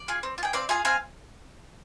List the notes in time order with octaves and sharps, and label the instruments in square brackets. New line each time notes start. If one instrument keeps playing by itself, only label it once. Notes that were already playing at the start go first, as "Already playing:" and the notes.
Already playing: [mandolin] D5
F4 G#4
C4
F4
G#4 G5
C4 D5 F5
F4 G#4 F5 G#5
C4 F5 G#5